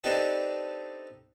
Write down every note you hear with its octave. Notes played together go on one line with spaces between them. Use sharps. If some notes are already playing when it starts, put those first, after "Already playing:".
C4 D4 D#4 G4 A4 B4